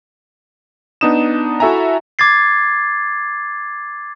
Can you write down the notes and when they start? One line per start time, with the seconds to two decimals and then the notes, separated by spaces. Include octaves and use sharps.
1.01 B3 D4 D#4 D#6 E7
1.60 E4 F#4 A4 E5 G#5 A#5
2.19 D6 G#6 A6 C7